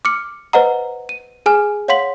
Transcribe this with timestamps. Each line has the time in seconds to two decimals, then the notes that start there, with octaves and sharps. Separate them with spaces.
0.05 D6 F6 C#7
0.53 B4 C5 D#5 F#5 A#5
1.09 D#7
1.46 G#4 G#5 F6
1.88 C#5 F5 F#5 C6 B6 F#7